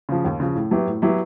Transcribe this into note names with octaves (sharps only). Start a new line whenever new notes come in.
C#3 F3
D#2
C#3 F3
A2
F#3 B3 E4 G4
A2
F#3 B3 E4 G4